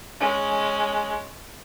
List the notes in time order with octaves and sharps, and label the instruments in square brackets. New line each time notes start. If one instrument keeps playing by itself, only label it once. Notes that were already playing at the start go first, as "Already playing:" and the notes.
[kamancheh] G#3 C#4